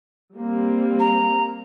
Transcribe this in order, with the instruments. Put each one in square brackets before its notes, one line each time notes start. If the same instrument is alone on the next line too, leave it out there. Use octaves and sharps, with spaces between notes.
[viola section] G3 A#3 C4
[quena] A#5